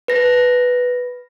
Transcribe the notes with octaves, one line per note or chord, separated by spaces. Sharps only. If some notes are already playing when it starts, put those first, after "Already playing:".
B4 A#6